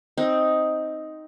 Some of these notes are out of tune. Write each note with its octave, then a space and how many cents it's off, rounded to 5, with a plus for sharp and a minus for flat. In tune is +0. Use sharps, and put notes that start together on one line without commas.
C4 +0 D#4 +5